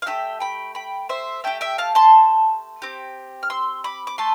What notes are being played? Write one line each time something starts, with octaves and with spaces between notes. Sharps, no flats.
F5
A3 D4 G4 E5 G5
G5 B5
G5 B5
C5 E5
A3 E4 G4 E5 G5
E5 G5
F5 A5
A5 C6
C4 G4
F6
C6 E6
B5 D6
D6
A3 A4 A5 C6